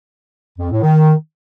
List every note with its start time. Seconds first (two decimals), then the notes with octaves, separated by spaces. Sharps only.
0.59 F2
0.71 A2
0.82 D#3